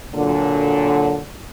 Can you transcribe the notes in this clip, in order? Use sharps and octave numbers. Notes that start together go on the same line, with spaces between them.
A#2 D3 F#3